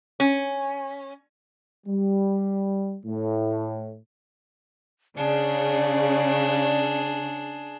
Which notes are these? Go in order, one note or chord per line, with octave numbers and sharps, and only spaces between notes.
C#4
G3
A2
C#3 D4 G#4 D5